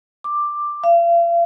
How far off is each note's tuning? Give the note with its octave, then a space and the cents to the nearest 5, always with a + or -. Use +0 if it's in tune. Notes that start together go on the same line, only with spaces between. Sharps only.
D6 +10
F5 -40